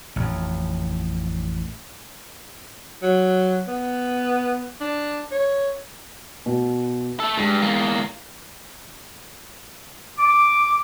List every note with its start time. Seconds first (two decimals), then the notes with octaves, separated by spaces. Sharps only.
0.16 A1 F2
3.03 F#3
3.68 B3
4.81 D4
5.31 C#5
6.46 B2
7.20 A3 A4
7.37 G2 G#3
7.62 E2 A#3
10.19 D6